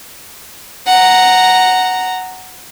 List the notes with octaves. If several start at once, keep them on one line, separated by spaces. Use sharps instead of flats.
F#5 A#5